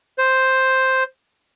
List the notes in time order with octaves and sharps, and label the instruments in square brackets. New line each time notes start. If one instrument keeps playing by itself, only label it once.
[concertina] C5